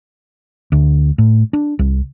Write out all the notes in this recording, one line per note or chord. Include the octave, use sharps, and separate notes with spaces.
D2
A2
D4
C2